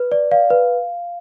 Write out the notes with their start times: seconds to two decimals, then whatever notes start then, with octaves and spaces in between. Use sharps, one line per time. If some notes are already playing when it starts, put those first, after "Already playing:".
Already playing: B4
0.12 D5
0.31 D5 F5
0.50 B4